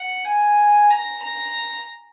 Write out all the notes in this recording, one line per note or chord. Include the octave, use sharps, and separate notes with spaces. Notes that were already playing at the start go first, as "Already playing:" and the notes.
Already playing: F#5
G#5
A#5
A#5